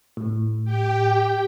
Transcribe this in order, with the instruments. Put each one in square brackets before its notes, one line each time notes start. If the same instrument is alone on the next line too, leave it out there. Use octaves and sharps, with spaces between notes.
[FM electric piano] A2
[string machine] G4 G5